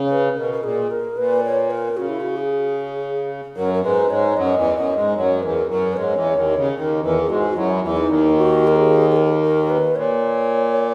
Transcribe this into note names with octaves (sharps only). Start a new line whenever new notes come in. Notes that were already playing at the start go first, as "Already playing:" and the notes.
Already playing: C#3
B4
B2 A#4
A#4
A#2 G#4
A#4
A#2 B4
C#5
A#4
C#3 F#4
E4
F#4
G#4
F#2 F#3 A#4
A#4
G#2 G#3 B4
G#2 G#3 C#5
F#2 F#3 D#5
E2 E3
F#2 F#3 D#5
G#2 G#3
F#2 F#3 C#5
E2 E3 A#4
F#2 F#3 A#4
B4
G#2 G#3 C#5
E2 E3
D#2 D#3
C#3
D#2 D#3 A#4
E2 E3 A#4
G#4
G#2 G#3 F#4
F#4
F#2 F#3 E4
E2 E3 E4
D#4
D#2 D#3
F#4
A#4
G#4
G#4
A#4
A#4
B4
A#2 C#5